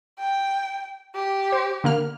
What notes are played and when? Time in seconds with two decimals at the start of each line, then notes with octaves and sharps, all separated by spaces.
0.19 G5
1.15 G4
1.52 C5
1.84 D3 A#3 F6